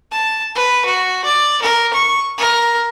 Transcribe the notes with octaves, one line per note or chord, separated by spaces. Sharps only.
A5
B4
F#4
D5
A#4
C#6
A#4